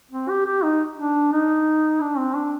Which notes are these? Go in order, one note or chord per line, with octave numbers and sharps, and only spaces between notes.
C4
G4
G4
D#4
D4
D#4
D4
C4
D4